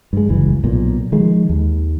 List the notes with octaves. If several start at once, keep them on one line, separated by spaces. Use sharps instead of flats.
G2 G#3
F#1 C#2 E3
B1 A#2
D#3 F3 G#3
D#2